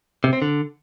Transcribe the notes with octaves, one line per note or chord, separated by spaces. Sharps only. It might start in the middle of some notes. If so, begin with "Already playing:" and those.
C3
C4
D3